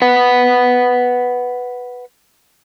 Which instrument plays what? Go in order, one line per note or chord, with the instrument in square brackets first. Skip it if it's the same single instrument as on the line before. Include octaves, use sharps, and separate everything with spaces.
[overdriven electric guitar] B4 F#5